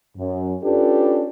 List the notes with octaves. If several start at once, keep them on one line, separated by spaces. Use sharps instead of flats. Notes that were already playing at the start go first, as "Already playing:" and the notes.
F#2
C#4 D4 F4 G4 A4 B4